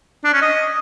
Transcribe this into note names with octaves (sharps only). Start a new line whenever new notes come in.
D4
C#4
D#5